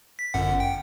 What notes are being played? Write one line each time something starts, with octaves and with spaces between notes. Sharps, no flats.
B6
G1 F#2 F#5
G5